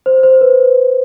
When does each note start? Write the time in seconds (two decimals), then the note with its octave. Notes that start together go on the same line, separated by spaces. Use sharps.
0.06 C5
0.23 C5
0.41 B4